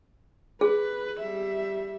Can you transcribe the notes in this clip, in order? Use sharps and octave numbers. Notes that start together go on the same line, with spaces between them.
G#4 B4
G3 E5